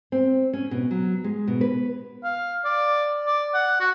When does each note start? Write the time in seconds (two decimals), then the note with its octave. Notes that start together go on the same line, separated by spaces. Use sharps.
0.12 C4
0.53 C#4
0.71 B2
0.91 F#3
1.24 G#3
1.48 B2
1.61 B4
2.23 F5
2.65 D5
3.26 D5
3.54 F#5
3.80 F#4